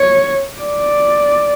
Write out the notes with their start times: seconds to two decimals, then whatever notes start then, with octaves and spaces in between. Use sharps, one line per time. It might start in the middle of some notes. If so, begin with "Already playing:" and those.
Already playing: C#5
0.61 D5